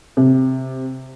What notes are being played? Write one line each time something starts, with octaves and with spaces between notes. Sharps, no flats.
C3